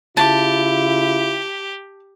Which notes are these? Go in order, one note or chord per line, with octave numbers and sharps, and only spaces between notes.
C#3 E4 F4 G4 A5